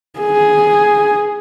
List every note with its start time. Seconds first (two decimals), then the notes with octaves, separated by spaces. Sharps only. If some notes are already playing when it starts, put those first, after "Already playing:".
0.20 G#4